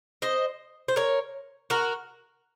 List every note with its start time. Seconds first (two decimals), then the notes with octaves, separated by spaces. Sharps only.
0.22 C5 D#5
0.88 C5
0.96 A#4 C#5
1.70 F#4 A#4